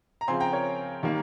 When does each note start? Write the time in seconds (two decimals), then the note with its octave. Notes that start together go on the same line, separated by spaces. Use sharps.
0.21 A#5
0.28 C#3 F3 C4 G#5 C6
0.40 G5 A#5
0.53 A#4 C#5
1.03 D#3 G3 A#3